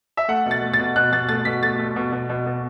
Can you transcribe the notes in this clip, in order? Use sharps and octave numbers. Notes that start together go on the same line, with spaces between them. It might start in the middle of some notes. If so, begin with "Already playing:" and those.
E5
A3 F#5
B2
A6
A3
A6
B2
B2 F#6
B2 A6
A3 A6
B2 B6
A3 A6
A3
B2
B2
B2
B2